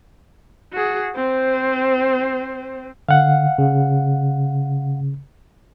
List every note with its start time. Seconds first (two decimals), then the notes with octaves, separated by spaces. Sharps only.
0.73 F#4 G#4
1.15 C4 C5
3.09 D3 F5 F#5
3.58 C#3